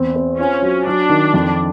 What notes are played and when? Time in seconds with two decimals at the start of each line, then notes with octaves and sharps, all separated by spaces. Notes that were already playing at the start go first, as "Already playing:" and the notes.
Already playing: E2 C4
0.16 C4
0.39 C#4 F4
0.62 F#3
0.86 F#3 D4
1.09 D#3
1.34 F2